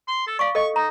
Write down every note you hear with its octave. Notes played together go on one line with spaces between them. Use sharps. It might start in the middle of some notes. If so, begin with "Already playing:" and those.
C6
A4
D5 F5 C#6
A4 D#5 C#6
D#4 A#5